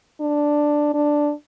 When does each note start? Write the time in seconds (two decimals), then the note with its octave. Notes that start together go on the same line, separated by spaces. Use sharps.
0.21 D4
0.94 D4